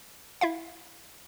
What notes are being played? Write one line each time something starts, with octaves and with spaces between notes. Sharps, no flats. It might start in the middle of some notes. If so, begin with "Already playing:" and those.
E4 E5 F5